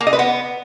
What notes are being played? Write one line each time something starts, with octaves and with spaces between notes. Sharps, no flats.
A#3
D#5
B4
B3